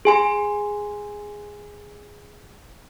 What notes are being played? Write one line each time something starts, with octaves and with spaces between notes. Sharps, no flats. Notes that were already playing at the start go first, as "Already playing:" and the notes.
G#4 G#5 C6